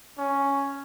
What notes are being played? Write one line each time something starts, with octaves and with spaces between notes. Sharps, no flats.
C#4